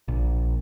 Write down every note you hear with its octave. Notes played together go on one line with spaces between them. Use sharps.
A#1